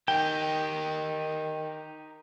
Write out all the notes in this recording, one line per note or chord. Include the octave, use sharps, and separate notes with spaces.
D#3 D#4 G4 G5